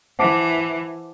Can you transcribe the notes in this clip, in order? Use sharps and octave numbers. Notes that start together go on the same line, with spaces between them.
E3 C5 F#5 A5 D6